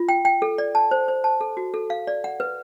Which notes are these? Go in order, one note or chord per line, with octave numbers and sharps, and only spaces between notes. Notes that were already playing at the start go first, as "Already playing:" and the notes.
Already playing: F4
G5
G5
A4
D5
A5
C5
C5
A5
A4
F#4
A4
F5
D5
F#5
B4